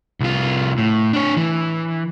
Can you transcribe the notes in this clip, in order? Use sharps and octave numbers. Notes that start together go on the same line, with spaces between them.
C2 F4
A2
D4 C#5
E3